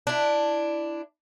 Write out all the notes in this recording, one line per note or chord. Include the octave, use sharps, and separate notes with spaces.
D4 E4